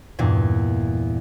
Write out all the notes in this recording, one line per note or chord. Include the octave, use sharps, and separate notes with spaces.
E2 G2 A#2